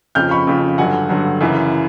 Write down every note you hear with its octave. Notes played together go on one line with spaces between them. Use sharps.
F2 C#3 F3 F6 G6
B5 C#6
F2 C#3 F3
G2 D3 F#3 F#5 G#5
G2 D3 F#3
F#2 C#3 E3